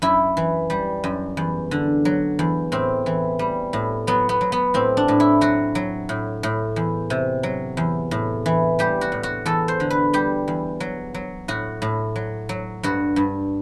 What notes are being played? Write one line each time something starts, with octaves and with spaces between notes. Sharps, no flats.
F#2 E4
E3
G3
F#2
E2
D3
F#3
E2
A2 C4
E3
G3
A2
F#3 B3
B3
F#3
B3
A2 C4
D4
A2
E4
F#3 F#4
F#3
A2
A2
E2
C3
F#3
E2
A2
E3
G3 G4
F#4
A2
F#4
E2 A4
C5
D3
B4
G3 G4
E2
F#3
F#3
A2 F#4
A2
F#3
F#3
G2 F#4
G2